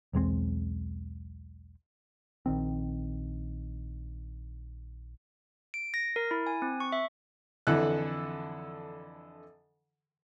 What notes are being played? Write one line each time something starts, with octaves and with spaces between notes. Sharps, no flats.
B1 E2 G#3 C4
A#1 D#3 C4
D7
A#6
A#4
E4
G#5
C4
C#6
E5
F2 D3 E3 E4 A4 F#6